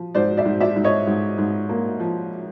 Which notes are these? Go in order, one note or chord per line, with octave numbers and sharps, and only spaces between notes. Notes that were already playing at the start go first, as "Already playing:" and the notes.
Already playing: F3
G#2 C5 D5
D5 E5
G#2
D5 E5
G#2
C#5 D#5
G#2
G#2
A#3
F3